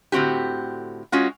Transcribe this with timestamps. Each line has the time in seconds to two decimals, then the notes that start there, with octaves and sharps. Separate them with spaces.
0.12 A2 D3 C4 F#4 G4
1.12 G#3 C#4 F4 F#4